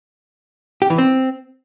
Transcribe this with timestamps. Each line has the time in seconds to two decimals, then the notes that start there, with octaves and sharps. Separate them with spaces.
0.82 G4
0.90 E3
0.98 C4